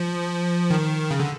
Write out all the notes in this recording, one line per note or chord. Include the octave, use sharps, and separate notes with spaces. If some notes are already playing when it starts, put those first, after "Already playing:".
Already playing: F3
D#3
C#3
D3